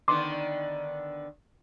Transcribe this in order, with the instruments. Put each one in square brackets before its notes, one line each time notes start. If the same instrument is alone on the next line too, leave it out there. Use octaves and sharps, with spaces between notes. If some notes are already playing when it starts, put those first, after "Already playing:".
[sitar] D3 D#3 B3 [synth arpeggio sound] C6 D6